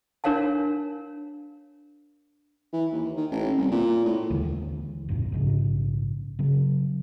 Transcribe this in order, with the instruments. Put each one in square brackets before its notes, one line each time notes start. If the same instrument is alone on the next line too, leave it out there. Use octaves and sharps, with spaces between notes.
[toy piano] D4 A#4 C#5 F5 A5
[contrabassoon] E3
D#2
D#3
A1
C2
A#2
A2
[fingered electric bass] D#2 D3 E3 G#3
B1 F#2 A#2
A#1 G#2 C#3
C#3 F#3